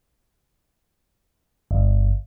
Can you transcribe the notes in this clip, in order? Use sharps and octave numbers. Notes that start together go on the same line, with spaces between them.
G1